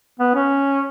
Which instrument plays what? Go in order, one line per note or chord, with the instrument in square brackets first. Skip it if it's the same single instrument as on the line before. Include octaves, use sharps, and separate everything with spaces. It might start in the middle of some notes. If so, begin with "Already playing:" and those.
[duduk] B3
C#4